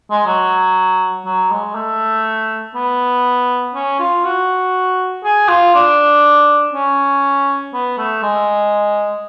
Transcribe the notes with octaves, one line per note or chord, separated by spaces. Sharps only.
G#3
F#3
F#3
G#3
A3
B3
C#4
F4
F#4
G#4
F4
D4
C#4
B3
A3
G#3